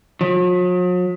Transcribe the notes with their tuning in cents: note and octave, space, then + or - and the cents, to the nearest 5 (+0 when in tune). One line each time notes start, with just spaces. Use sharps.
F#3 -45